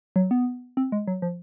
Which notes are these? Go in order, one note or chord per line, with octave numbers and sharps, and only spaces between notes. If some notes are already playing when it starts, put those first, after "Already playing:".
F#3
B3
C4
G#3
F#3
F3